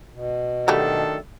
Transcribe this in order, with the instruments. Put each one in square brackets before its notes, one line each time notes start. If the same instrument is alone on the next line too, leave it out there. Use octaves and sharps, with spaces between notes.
[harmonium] B2
[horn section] D#3 D4 A4 [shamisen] F#3 G3 A3